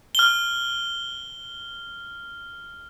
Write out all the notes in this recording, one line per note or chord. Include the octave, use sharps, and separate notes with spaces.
F6 G7